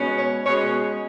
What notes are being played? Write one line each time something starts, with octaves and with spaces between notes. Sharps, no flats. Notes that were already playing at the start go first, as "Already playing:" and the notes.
Already playing: B2 G#3 C#4
C#5
B2 G#3 C#4 C#5